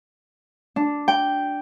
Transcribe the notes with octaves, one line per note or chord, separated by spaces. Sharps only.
D4
G5